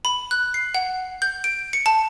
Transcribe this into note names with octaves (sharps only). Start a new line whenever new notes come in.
B5
F#6
C7
F#5
G6
D7
C#7
A5